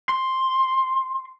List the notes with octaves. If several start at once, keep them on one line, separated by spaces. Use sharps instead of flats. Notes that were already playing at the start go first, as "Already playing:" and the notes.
C6